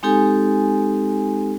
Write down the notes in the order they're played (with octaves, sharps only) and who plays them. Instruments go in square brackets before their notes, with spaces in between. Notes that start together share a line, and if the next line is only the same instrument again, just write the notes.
[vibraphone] G#3 C4 D#4 G4 A4 G#5